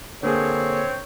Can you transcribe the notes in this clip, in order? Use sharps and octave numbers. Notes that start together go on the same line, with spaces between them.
D3 A#3 C4 G#4 C#5